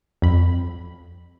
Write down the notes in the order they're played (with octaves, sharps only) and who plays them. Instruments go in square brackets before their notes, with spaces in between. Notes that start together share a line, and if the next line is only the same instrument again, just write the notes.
[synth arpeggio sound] F2 B5